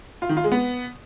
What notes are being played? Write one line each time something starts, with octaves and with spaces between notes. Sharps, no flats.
F4
D#3
F4
G#3
B3